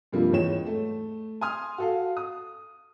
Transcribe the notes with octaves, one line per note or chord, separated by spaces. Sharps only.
G2 C3 F3 G3 A#3 F4
E2 G#2 C#5 G5 E7
A3
G#5 C6 D#6 F6
F#4 A4 F5
D#6